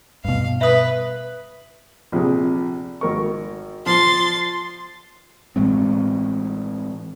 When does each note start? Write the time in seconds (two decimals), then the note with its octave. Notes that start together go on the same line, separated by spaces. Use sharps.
0.25 G2 B2 F5
0.61 B4 E5 D#6
2.12 A#1 C3 G#4
3.01 G#1 A#4 C#6
3.86 F3 C6 A6
5.56 A2 E3 G#3 C4